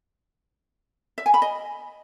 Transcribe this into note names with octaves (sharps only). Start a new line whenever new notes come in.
E5
G#5
B5
D#5